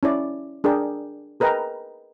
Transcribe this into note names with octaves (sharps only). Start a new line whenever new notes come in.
C#4 E4 D5
D4 G#4 A#4 D5 G5
G#4 A#4 B4 D#5 G5 A#5